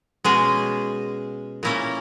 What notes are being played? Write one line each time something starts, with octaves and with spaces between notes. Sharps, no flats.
B2 G#3 C#4 G#4
A#2 A#3 C#4 E4